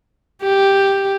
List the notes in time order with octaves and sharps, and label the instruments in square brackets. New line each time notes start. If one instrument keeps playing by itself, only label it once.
[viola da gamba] G4